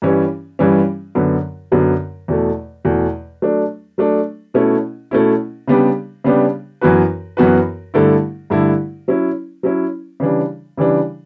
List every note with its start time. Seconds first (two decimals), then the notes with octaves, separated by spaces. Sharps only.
0.02 G2 E3 G3 C#4
0.59 G2 E3 G3 C#4
1.15 F#2 D3 F#3 B3
1.72 F#2 D3 F#3 B3
2.28 E2 B2 A3
2.85 E2 B2 A3
3.42 F#3 A3 D4
3.98 F#3 A3 D4
4.54 B2 A3 C#4 E4
5.11 B2 A3 C#4 E4
5.68 C#3 G3 B3 D4 G4
6.24 C#3 G3 B3 D4 G4
6.81 F#2 E3 B3 F#4 B4
7.37 F#2 E3 B3 F#4 B4
7.94 G2 D3 A3 E4
8.50 G2 D3 A3 E4
9.08 F#3 C#4 E4
9.63 F#3 C#4 E4
10.20 C#3 E3 G3 D4
10.77 C#3 E3 G3 D4